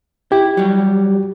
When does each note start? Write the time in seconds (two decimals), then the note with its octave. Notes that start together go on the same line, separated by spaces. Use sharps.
0.32 E4 G4
0.57 F#3 G3